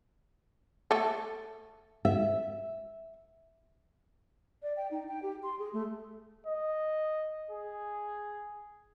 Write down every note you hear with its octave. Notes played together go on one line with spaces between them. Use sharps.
A3 A4
E5
D5
G5
D#4
G5
G4
C6
G#4
A3
D#5
G#4